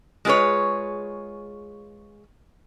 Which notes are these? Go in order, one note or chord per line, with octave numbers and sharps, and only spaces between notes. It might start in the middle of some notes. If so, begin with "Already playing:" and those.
G#3 F4 G#4 B4 C#5